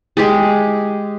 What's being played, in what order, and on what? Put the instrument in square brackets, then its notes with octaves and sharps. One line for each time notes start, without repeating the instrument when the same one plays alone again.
[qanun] G#3 G4 G#4